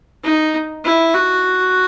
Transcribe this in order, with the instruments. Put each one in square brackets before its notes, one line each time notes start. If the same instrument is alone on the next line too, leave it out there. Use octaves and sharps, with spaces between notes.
[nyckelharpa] D#4
E4
F#4